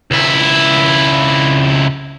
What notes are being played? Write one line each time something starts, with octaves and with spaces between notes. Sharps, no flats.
C#2 E4